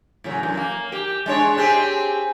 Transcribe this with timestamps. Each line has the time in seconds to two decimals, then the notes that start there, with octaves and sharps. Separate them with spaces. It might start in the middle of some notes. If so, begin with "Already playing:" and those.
0.24 A2 C#3 F#3
0.43 F#2
0.57 A#3
0.92 G4
1.26 G#3 D4 C#5
1.57 C4 G4 G#4